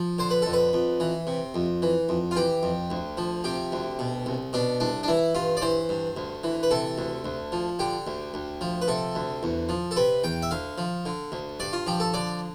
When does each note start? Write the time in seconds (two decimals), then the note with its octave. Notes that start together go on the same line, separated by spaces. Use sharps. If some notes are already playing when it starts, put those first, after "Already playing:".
Already playing: F3
0.19 D3 C5
0.31 B4
0.42 F2 A4
0.53 B4
0.73 F2
1.00 E3
1.27 C3
1.55 F2
1.82 E3
2.09 F2
2.31 F4
2.36 E3 G4
2.63 F2
2.90 D2
3.17 F3
3.44 C3 G4
3.72 D2
3.99 B2
4.26 C2
4.53 B2 D4
4.80 C2 D4
5.03 D4
5.08 E3 E4
5.35 G2 F4
5.57 D5
5.62 E3 C5
5.89 G2
6.17 D2
6.44 E3
6.63 B4
6.71 C3 A4
6.98 D2
7.25 D2
7.52 F3
7.79 D3 G4
8.07 D2
8.34 D2
8.61 F3
8.82 B4
8.88 C3 A4
9.15 D2
9.43 E2
9.69 F3
9.91 A4
9.96 C3 B4
10.24 E2 G5
10.42 E5
10.51 D2 F5
10.78 F3
11.06 D3
11.32 D2
11.60 G2 D5
11.73 F4
11.87 F3 G4
12.00 A4
12.14 D3 D5